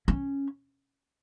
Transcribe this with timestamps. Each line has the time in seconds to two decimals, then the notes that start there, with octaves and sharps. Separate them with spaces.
0.08 C#4